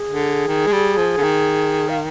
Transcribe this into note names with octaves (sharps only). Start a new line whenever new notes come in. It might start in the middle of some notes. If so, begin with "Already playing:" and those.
Already playing: G#4
D3
D#3
G#3
G3
F3
D3
D#3
F5